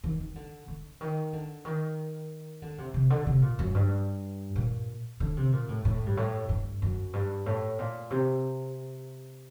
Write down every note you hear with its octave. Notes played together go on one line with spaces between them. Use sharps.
D#3
D#3
D3
D3
D#3
D3
D#3
D3
C3
C3
D3
C3
A#2
F#2
G2
A#2
D3
C3
A#2
A2
A2
G2
A2
G2
F#2
G2
A2
A#2
C3